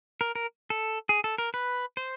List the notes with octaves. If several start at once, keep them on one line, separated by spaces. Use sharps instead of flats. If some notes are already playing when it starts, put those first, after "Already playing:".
A#4
A#4
A4
G#4
A4
A#4
B4
C5